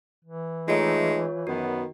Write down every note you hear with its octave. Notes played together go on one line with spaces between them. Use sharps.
E3
G#3 A3 D#4 F4 C#5
F#2 D#3 B3 F#4